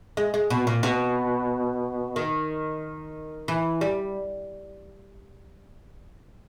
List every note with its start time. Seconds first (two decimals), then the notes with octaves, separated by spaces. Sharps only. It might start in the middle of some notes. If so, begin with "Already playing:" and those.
0.17 G#3
0.34 G#3
0.50 B2
0.67 A#2
0.83 B2
2.16 D#3
3.48 E3
3.81 G3